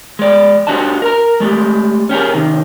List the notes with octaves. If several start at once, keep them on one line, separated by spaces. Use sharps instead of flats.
G#3 D5
D4 F#4 G4 D#5 A5
A#4 A#5
G#3 A3 G4
C#4 G4 G#4 A#4
C3 D#3